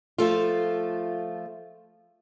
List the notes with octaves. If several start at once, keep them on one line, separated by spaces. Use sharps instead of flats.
F3 A3 F4